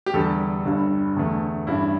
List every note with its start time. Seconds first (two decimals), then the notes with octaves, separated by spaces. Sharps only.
0.06 G4
0.14 E2 D3 G3 A4
0.65 G1 G2 G3
1.17 E2 D3 A3
1.67 A1 G2 G3 E4